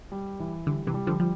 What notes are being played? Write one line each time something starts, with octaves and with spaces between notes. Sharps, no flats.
G3
E3
D3 G3
C3 E3
G3
D3 F3
F3 G3